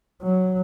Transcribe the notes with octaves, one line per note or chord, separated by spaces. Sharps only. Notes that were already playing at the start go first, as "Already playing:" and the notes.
F#3